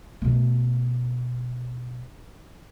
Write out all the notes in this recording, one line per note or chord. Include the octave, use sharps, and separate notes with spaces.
B2 A3